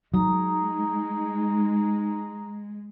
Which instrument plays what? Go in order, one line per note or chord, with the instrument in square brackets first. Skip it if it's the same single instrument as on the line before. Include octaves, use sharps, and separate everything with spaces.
[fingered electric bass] F#3 [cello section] G#3 [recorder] D#4 [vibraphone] A#5 D#6